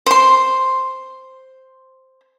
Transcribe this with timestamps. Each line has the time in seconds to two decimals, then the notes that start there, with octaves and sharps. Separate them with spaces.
0.06 C5 C6